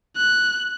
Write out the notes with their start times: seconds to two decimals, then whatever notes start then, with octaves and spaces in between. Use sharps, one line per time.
0.17 F#6